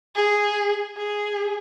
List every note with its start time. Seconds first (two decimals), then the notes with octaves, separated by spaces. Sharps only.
0.15 G#4
0.97 G#4